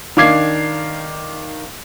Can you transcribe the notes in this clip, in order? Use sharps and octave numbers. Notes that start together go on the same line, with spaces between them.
D#3 D4 F5 D6 G#6 C7